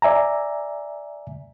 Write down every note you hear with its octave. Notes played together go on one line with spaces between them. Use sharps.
D5 E5 G#5 A#5